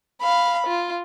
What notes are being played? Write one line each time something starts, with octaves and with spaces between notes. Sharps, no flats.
F5 B5
F4